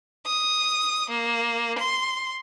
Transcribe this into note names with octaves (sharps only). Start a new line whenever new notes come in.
D#6
A#3
C6